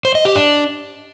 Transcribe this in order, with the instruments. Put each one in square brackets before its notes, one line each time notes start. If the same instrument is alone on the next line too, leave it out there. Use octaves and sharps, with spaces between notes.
[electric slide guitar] C5
D#5
G4
D4